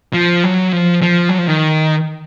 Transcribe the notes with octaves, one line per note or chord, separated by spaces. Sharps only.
F3
F#3
F3
F3
F#3
F3
D#3